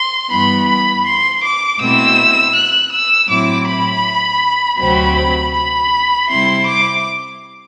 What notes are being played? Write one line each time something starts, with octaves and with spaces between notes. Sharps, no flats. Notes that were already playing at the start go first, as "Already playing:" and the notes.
Already playing: C6
G2 E3 G3 B3 B5
B5
C6
D6
B2 A3 C4 E4 E6
F#6
E6
A2 F#3 C4 E4 D6
B5
D2 C3 F#3 C4 B5
B5
C3 G3 C4 E4 C6
D6